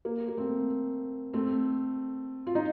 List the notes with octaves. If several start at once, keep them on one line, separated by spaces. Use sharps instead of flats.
A#3
A#3
A3 C4
A3 C4
F4
D#4